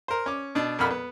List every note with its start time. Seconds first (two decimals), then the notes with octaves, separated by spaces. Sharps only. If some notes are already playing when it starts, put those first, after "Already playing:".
0.08 A#4 C5
0.26 C#4 D6
0.55 B2 D4
0.79 F2 A#2 A#3 F#5 B5 F6
0.91 B3